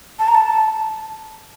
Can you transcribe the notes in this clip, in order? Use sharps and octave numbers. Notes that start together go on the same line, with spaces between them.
A5
A#5
A5